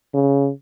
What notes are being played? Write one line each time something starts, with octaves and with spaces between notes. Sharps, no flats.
C#3